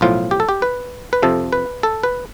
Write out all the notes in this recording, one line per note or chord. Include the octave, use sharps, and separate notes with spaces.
B1 A2 F3 F4
G4
A4
G4
B4
B4
F2 C3 F3 A4
B4
A4
B4